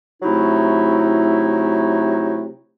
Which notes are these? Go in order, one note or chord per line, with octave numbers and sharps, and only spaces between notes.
C3 F#3 A3 D#4 E4